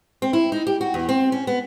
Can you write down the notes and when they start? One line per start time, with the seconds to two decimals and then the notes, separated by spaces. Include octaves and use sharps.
0.22 C4
0.33 E4
0.52 D#4
0.67 G4
0.81 F#4
0.94 E2
1.09 C4
1.32 C#4
1.47 B3